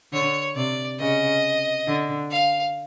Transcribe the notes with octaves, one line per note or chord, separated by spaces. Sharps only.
D3 C#5
C3 D5
C#3 D#5
D3
F5